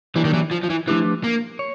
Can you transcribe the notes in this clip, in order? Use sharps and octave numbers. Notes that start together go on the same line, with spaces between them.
E3 F#3 A#3 D4 G4
D#3
E3
F3
F3
E3
E3 F3 A3 D4 G4 B4
A#3
C#5